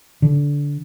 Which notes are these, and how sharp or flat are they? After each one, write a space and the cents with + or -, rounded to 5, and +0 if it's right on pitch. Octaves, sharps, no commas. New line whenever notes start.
D3 -20